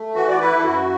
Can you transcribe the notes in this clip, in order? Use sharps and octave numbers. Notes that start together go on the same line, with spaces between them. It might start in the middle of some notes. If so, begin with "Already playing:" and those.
Already playing: A3
E3 F#4
D5
E4 B4
A4
F#2 F#4